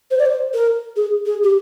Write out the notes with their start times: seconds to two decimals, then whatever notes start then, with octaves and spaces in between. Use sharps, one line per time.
0.11 C5
0.19 D5
0.26 C5
0.54 A#4
0.96 G#4
1.26 G#4
1.43 G4